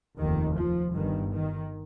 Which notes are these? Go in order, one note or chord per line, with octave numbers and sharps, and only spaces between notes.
F1 D#2 D#3
F3
G1 G2 D#3
D#3